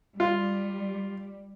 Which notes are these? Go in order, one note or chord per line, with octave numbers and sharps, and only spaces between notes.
G3 F4